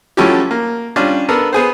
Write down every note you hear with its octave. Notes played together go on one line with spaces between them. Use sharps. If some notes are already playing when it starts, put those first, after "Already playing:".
F3 F#3 A3 C#4 E4 G4
A#3
G3 C#4 D4 F4
B3 D4 A4 A#4
B3 G#4 C5